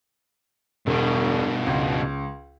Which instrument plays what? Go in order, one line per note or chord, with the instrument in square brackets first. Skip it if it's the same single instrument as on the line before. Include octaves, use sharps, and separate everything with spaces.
[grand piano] E1 [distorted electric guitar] G2 B2
[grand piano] C#2